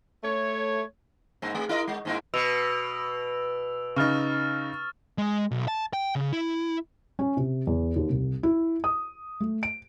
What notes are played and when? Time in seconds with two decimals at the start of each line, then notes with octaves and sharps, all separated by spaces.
0.24 A3 C#5
1.42 G#2 A#3
1.55 A3
1.69 E4 A#4 D#5
1.88 G#3
2.05 G#2 A#3 E4
2.34 B2 E6 D7 F7
3.96 C#3 D#4 C#6 F6 A6
5.18 G#3
5.51 B1
5.68 A5
5.93 G5
6.16 C#3
6.32 E4
7.19 C#4
7.37 C3
7.67 E2
7.96 D#2
8.09 C2
8.43 E4
8.84 D#6
9.40 A3
9.63 D7